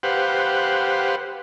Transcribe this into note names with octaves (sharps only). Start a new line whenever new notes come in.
G4 B4 C5 F5 F#5